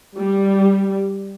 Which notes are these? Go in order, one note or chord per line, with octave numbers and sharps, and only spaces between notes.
G3